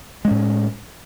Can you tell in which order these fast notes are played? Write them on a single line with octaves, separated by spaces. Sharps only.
G#3 C#4 A2